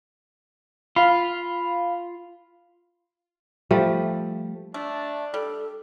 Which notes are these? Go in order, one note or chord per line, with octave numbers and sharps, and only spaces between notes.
F4 F5 B5
F3 G3 A3
A3 D4
G3 A4